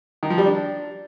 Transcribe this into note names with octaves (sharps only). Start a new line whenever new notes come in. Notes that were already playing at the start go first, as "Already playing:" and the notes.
D#3
F3
G3
D4